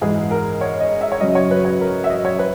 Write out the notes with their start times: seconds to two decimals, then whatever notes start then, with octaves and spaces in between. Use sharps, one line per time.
0.01 G#2 E3 G#3 G#4
0.31 A#4
0.61 C#5
0.81 D#5
1.01 E5
1.12 C#5
1.21 F#2 C#3 F#3 D#5
1.35 C#5
1.51 B4
1.65 C#5
1.81 A#4
2.04 E5
2.10 D#5
2.25 C#5
2.39 B4